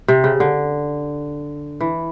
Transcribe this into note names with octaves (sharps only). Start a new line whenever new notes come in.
C3
C#3
D3
E3